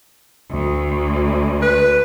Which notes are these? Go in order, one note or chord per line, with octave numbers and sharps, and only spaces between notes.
D2
B4